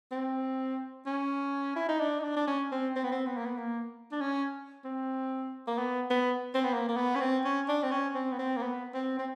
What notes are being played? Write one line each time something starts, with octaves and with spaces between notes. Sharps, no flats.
C4
C#4
E4
D#4
D4
D#4
D4
D4
C#4
C4
C4
B3
C4
B3
A#3
B3
A#3
D4
C#4
C4
A#3
B3
B3
C4
B3
A#3
A#3
B3
C#4
C4
C#4
D4
C4
C#4
C4
B3
C4
A#3
B3
C4
C4